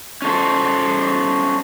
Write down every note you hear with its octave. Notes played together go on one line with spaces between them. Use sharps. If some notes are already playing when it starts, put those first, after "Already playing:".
C#4 A4 C5